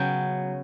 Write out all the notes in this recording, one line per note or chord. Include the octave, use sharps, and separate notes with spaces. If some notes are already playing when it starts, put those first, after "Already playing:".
Already playing: C#3 F#3 B3 G5